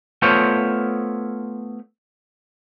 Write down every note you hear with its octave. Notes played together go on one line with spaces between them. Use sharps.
A3 B3 F4 C5 C#5 E5